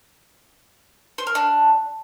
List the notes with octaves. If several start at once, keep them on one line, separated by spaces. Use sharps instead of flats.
C5
A#4
D4